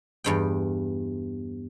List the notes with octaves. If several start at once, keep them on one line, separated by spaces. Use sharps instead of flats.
E2 G2 G5